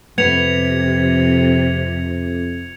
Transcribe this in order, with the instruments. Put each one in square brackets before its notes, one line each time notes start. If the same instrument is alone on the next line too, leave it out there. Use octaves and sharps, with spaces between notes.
[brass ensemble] F2 [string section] C3 [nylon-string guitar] B3 [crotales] G#6 C#7 F7